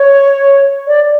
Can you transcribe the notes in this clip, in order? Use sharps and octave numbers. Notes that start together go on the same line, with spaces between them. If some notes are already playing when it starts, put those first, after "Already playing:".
Already playing: C#5
D5